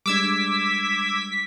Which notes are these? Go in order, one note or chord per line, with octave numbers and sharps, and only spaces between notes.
G3 G#3 D4 D6 E6 G#6 B6